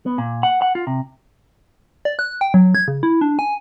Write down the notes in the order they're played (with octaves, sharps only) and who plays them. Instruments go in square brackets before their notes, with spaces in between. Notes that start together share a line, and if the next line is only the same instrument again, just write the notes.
[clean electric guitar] B3
A#2
F#5
F#5
F4
C3
[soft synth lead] D5
F#6
G5
F#3
G#6
C#3
E4
D4
G#5